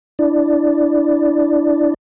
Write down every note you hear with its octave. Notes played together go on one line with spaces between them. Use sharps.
D4 E4 D5